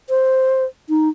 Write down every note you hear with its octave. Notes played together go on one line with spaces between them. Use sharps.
C5
D#4